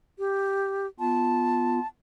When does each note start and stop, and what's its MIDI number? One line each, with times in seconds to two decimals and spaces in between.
0.19 0.87 67
0.99 1.79 59
0.99 1.79 65
0.99 1.87 81